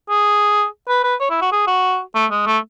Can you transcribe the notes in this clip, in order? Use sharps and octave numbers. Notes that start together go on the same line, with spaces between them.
G#4
B4
B4
C#5
E4
F#4
G#4
F#4
A3
G#3
A3